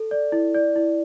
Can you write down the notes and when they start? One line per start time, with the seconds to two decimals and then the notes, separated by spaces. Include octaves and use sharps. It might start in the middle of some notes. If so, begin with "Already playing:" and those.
Already playing: A4
0.11 D5
0.32 E4
0.54 D5
0.76 E4